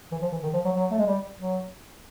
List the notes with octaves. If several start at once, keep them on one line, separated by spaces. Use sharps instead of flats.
E3
F3
E3
D#3
F3
F#3
F#3
A3
G#3
G3
F#3